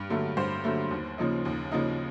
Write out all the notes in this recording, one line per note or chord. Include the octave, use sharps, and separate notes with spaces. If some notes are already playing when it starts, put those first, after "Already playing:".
Already playing: G2
D3 F#3 A3
G2 C5
D3 F#3 A3
D#2
C#3 F3 A#3 D#4
D#2
C#3 F3 A#3 D#4